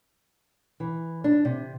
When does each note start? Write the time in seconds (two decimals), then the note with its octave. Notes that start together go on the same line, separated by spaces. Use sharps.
0.80 E3
1.24 D4
1.45 C3